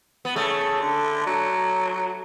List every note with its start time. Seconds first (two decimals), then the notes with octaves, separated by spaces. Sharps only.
0.25 B3
0.35 C#3 A3
0.81 D3
1.26 F#3